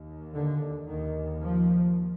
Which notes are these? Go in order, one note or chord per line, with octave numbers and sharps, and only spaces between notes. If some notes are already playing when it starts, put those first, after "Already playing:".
Already playing: D#2
D3
D#2 D#3
F3